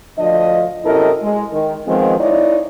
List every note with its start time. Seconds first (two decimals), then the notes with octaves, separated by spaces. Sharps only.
0.18 D2 F3 D4 D#5
0.84 F#2 C3 E4 A4 A#4 D#5
1.22 G#3
1.52 D#3
1.87 D#3 F3 G#3 B3 C4 F4
2.19 D#4 E4 C#5 D5